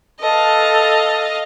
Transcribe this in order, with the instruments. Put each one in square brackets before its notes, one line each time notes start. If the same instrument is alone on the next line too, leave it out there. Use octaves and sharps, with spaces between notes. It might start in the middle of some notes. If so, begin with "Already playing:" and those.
[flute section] A4 B4 [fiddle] D#5 F5